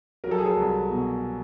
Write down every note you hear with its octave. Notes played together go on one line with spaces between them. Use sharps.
F#3 A#4
A4
G#4
A4
C2
B2